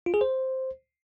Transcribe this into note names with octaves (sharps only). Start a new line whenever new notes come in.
F4
G#4
C5